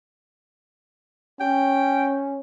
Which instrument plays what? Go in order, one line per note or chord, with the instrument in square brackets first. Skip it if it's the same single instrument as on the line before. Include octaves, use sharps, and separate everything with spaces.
[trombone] C#4 [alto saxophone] G5